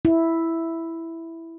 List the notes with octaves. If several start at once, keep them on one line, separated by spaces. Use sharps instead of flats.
E4